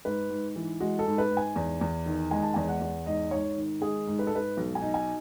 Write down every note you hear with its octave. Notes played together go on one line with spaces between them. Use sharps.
G#2 B4
G#2
E3
G#3 F#4
A4
G#2
B4
G#2
G#5
E2
E2
D#3
G#3 G#5
A5
E2 G#5
F#5
E2
G#2 D#5
G#2 C#5
D#3
G#3 G#4
G#2
B4
A4
G#2 B4
B1
G#5
D#4
G#5